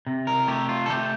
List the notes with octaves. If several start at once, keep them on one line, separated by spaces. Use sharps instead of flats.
C3
A#4
A3 G4
F4
A4
A3 G4